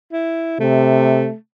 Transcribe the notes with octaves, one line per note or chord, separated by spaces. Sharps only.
E4
C3 A3